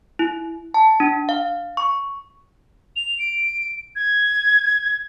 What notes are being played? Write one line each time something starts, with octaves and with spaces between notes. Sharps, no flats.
E4
A5
D4
F5
C#6
F7
D7
G#6